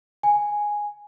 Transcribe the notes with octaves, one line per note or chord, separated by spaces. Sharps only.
G#5